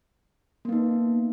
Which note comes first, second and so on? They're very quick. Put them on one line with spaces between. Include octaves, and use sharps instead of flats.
A#3 B3 D#4